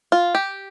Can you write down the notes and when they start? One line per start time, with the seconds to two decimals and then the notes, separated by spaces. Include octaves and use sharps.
0.12 F4
0.35 G4